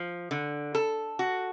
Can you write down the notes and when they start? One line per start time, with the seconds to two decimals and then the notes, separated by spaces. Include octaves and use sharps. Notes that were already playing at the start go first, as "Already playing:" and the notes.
Already playing: F3
0.31 D3
0.75 A4
1.19 F#4